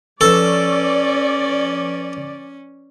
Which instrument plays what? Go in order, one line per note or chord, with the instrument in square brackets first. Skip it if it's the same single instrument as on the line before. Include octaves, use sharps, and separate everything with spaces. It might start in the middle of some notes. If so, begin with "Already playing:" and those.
[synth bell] F3 B4 C#6 [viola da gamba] C#4 [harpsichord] A4 [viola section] D5